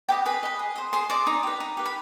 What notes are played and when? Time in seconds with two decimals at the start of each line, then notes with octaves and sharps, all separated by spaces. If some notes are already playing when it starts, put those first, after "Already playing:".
0.09 G4 B4 D#5 G5
0.26 G#4 B4 B5
0.43 B4 D#5
0.59 G#4
0.76 C5 D#5
0.93 G#4 C5 C6
1.10 C5 D5 D#5 D6
1.27 D#4
1.43 G4 B4
1.60 D#4
1.77 G4 B4
1.86 B5